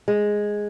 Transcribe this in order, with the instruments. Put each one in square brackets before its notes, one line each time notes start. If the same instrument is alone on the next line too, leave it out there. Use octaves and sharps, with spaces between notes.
[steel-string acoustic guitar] G#3